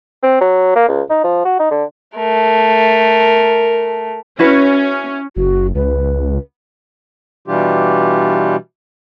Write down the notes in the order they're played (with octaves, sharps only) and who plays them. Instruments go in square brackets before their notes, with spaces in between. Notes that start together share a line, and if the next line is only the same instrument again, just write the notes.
[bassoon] C4
F#3
A#3
C#2
D#4
F3
F#4
D#4
D3
[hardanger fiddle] A3 A#4
[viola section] C#4 [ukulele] E4 F#4 B4
[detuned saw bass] F#1 [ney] F#4
[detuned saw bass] C#2 [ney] B4
[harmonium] B2 E3 G3 D4 F4 G4